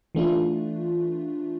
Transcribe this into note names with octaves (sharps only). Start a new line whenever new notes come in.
E3 A3 D4 F4